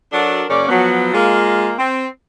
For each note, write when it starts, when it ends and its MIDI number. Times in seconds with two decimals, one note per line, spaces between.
0.13 0.44 54
0.13 0.44 62
0.13 0.44 66
0.13 0.44 69
0.13 0.44 70
0.13 0.44 74
0.50 0.67 42
0.50 0.67 49
0.50 0.67 58
0.50 0.67 61
0.50 0.67 74
0.69 1.14 53
0.69 1.14 54
0.69 1.14 59
1.14 1.74 56
1.14 1.74 58
1.14 1.74 65
1.78 2.08 60